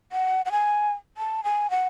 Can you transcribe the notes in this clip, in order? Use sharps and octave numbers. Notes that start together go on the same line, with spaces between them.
F#5
F#5
G#5
A5
G#5
F#5